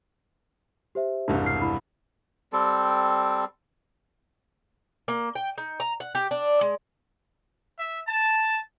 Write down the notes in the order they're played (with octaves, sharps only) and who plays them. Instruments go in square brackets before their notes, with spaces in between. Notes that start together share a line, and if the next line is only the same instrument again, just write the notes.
[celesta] G4 C5 E5
[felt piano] E1 C2 G2
[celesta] F6 C7
E4 B5
[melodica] G3 C4 A4
[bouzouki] A#3
G5
D#4
A#5
F#5
G4
D4
G#3
[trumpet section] E5
A5